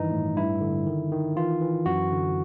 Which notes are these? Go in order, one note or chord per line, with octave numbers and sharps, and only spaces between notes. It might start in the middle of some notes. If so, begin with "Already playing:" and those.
Already playing: G2 D#3 E3 D#4
A2
G2 E4
D3
D#3
D#3
E3 F4
E3
F#2 F#4
D3